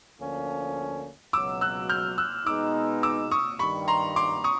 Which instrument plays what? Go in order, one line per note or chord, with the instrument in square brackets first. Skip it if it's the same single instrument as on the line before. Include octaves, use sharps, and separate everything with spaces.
[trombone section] D2 D3 F3 A#3 C#4
[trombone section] C#2 B2 F#3 [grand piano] D6 E6
[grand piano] E6 F#6
F6 G6
E6 F#6
[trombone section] B2 G#3 B3 D#4 [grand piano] D6 E6
[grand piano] D6 E6
C#6 D#6
[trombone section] G2 D#3 G3 [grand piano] B5 C#6
[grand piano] A#5 C6
C6 D6
C#6 D#6